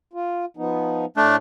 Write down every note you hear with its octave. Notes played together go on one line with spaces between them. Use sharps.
F4
F3 B3 D#4
A2 A3 D4